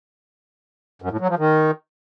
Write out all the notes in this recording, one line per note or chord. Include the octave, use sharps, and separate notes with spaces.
F#2
A2
F#3
F3
D#3